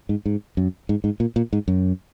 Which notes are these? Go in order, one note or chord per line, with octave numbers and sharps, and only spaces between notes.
G#2
G#2
F#2
G#2
G#2
A#2
A#2
G#2
F#2